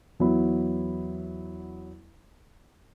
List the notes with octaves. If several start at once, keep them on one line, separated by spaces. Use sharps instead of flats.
E2 F#3 B3 E4 B5